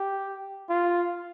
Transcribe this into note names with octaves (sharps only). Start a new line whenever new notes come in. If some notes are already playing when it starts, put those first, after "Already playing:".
Already playing: G4
F4